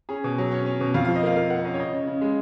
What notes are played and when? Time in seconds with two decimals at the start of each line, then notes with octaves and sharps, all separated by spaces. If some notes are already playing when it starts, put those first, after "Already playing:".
0.09 C#4 G#4
0.24 B2
0.38 F#3
0.51 C#4
0.66 C#4
0.81 B2
0.94 F2 F5
1.05 F5
1.08 F3
1.16 D#5
1.23 A#3 F5
1.37 A#3 F5
1.50 A#3 F#5
1.65 C#4 D#5
1.74 C#5
1.79 C#3 D#5
1.93 C#3
2.07 C#3
2.21 G#3